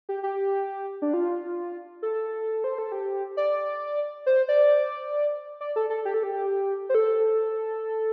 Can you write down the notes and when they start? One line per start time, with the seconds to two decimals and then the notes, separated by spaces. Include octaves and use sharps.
0.09 G4
0.23 G4
1.02 D4
1.14 F4
2.02 A4
2.64 C5
2.78 A4
2.92 G4
3.37 D5
4.26 C5
4.49 D5
5.61 D5
5.76 A4
5.90 A4
6.05 G4
6.14 A4
6.23 G4
6.89 C5
6.95 A4